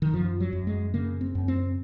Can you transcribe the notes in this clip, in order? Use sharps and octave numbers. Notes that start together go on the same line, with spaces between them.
D#3
F#2 F3
F#3
F#2
G#3
C#3 A#3
C4
F#2
C4